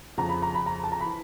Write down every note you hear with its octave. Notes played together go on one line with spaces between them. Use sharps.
F2 C#3 F3 A#5
B5
A#5
B5
A#5
A5
A#5
E3 B5